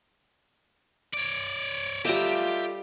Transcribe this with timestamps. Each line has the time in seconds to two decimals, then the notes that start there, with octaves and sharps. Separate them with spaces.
1.13 C#5 D5
2.05 G3 F4 G4 A4 D#5 E5 A#5 D6